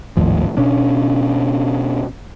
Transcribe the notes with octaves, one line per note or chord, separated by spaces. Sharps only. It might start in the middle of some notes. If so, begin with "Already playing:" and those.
G#1 D#2 A2 F3
B2 C#4 D4